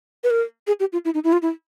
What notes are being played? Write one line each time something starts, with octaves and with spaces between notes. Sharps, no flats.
B4
A#4
G#4
G4
F4
E4
D#4
E4
F4
E4